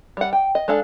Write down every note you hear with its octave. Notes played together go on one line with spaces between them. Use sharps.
G3 F#5
G5
D#5
G#3 D4 A4 F5